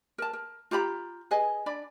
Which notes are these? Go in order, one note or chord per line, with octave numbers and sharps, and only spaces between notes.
A#4 A5
A#4
F4 G4 A#5 B5
G#4 B4 D#5 G#5
D4 D5 B5